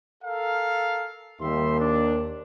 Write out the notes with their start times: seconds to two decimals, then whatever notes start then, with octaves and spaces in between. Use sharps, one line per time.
0.23 A4 A#4 F5
1.41 D#2 G3 E5 C6
1.79 D4